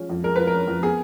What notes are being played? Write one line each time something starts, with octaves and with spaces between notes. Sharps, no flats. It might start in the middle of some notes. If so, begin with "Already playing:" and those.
Already playing: F3 G#3 C#4
F2
G#3 A#4
F3 B4
A#4
C#4
F2
B3 G#4